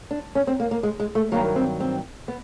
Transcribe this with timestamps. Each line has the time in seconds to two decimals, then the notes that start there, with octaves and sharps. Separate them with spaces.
0.11 D4
0.35 C#4
0.47 C4
0.60 A#3
0.71 A#3
0.83 G#3
1.00 G#3
1.15 A3
1.32 G2 D#3 F#3 A#3
1.56 C4
1.80 C4
2.28 B3